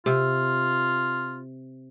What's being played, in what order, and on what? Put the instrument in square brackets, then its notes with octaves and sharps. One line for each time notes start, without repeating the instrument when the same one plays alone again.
[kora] C3 [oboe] F4